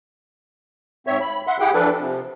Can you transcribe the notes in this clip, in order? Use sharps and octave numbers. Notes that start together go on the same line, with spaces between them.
G#2 C4 C#5 E5
B5
E5 F#5 C6
E4 G4 G#4 F#5 G5
E3 F3 D4 A4 B4
C3 F3